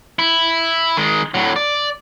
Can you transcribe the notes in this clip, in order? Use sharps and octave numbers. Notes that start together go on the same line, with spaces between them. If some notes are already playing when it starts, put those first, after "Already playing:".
E4
D#3 G#3
A2 F#3
D5